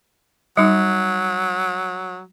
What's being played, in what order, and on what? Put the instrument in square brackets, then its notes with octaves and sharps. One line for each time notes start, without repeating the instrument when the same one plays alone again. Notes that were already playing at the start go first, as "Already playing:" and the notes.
[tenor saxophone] F#3 [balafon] G3 D#4